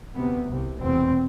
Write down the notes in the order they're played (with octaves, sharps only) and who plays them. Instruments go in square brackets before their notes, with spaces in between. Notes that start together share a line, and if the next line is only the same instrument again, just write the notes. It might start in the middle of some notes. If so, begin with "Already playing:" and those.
[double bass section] D2 C3 B3
C2 C3
F1 E2 B2 C4